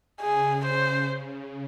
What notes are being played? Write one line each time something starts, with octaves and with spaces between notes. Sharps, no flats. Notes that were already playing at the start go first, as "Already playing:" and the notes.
C#3 G#4
C5